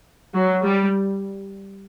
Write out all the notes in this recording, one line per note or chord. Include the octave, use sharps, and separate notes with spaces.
F#3
G3